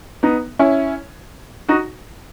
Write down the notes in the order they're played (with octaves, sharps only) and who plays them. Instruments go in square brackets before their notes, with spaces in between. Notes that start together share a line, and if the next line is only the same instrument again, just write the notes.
[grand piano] B3 D#4
C#4 E4
D#4 F#4